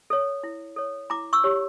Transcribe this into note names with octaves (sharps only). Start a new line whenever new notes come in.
A4 C#5
E4
A4 C#5
E4 A#5 D6
C#6 E6
G4 C#5